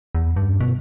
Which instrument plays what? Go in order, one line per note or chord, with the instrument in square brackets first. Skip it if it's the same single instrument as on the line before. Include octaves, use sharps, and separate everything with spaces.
[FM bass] E2
G2
B2